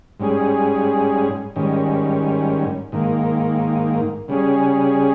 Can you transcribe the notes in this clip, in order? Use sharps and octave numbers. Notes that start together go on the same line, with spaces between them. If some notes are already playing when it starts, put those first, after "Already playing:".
G#2 G3 C#4 G#4
G#2 D#3 G3 C#4
G#2 D#3 A#3
C#3 G3 C#4 G#4